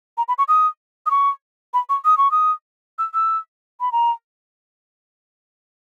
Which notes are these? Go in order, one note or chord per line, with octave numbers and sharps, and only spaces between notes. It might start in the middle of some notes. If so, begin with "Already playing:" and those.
A#5
B5
C#6
D#6
D#6
C#6
B5
C#6
D#6
C#6
D#6
E6
E6
B5
A#5